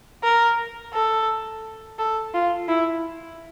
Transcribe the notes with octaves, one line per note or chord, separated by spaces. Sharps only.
A#4
A4
A4
F4
E4